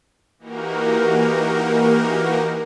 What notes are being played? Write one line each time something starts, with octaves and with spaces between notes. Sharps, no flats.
E3 A#3 D#4 F#4 G4 A#4